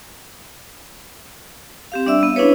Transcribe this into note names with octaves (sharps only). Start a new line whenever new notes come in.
C4 G4 F5
G3 D4 D5 E5 E6
B3
C#4 D4 E4 G#4 B4 C#5